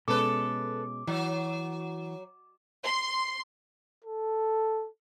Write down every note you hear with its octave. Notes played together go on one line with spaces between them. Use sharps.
B2 G#3 C#4 A4 B4 D6
E3 F#3
C6
A4